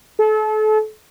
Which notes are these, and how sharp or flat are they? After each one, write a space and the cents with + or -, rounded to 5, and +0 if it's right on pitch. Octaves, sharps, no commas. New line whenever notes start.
A4 -35